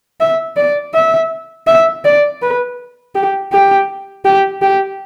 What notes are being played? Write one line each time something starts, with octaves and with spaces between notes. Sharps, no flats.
E5
D5
E5
E5
D5
B4
G4
G4
G4
G4